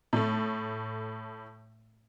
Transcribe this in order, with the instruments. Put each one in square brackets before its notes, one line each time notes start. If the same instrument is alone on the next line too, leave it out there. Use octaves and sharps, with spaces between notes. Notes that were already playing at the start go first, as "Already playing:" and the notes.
[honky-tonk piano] A2 A3